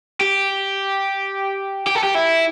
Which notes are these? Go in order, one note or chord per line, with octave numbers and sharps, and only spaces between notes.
G4
G4
A4
G4
E4